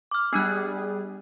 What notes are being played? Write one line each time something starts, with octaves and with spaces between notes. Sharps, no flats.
D6 F6
G3 B3 D4 G#4 F#6